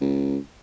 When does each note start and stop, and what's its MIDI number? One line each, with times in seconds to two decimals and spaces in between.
0.01 0.37 37